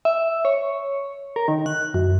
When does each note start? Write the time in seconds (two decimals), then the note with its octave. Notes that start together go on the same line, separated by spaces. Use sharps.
0.05 E5
0.45 C#5
1.36 A#4
1.48 D#3
1.66 F#6
1.94 F#2